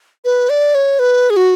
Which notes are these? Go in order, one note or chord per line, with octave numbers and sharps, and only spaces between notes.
B4
D5
C#5
B4
G#4
F#4